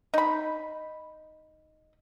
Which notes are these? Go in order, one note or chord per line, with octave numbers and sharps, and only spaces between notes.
D#4 B5